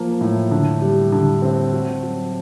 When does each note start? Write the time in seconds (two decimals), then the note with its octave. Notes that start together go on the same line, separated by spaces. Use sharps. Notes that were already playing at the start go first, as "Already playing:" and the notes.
Already playing: F3 A#3
0.21 A2
0.51 D3
0.82 G3
1.12 D3
1.42 C4
1.72 F#4
2.03 F#3